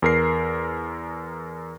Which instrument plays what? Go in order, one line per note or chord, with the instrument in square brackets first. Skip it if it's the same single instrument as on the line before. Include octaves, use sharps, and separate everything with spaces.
[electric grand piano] E2 A#4 C7